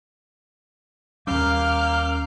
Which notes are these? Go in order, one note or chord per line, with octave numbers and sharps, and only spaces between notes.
D#2 G3 A#3 C#4 F5 D6 F6 G6